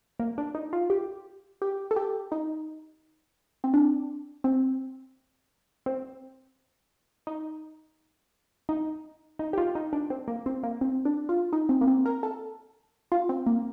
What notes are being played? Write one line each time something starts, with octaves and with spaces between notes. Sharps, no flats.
A#3
D4
D#4
F4
G4
G4
A4
G4
D#4
C4
D4
C4
C4
D#4
D#4
D#4
G4
F4
D#4
D4
C4
A#3
C4
A#3
C4
D4
F4
D#4
C4
A#3
C4
A#4
A4
F4
C4
A#3